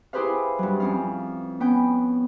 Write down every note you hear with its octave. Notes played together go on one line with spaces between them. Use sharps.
E4 G4 G#4 B4 C5 F5
G2 F#3
F2 C#4 F5
B3 C#4 G5